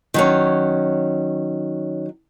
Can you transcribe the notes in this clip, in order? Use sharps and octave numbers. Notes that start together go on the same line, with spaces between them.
D#3 F#3 C#4